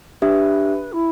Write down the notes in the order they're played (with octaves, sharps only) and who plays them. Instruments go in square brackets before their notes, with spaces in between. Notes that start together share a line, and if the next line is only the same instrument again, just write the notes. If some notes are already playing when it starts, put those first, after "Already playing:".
[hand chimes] D4 G4 E5 [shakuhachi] B4
[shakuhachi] E4